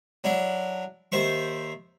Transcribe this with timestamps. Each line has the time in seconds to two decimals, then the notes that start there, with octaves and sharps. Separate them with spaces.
0.24 F#3 D4 E4
1.12 D#2 C5 E5 C#6